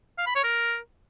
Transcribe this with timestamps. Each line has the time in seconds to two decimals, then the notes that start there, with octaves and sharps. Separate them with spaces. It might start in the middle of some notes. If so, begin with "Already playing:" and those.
0.18 F5
0.27 B5
0.35 C#5
0.44 A#4